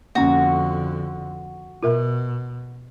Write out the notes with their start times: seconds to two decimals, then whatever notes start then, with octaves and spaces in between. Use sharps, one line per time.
0.15 F2 D3 A#3 C#4 F#4
1.83 B2 F4 A#4 E5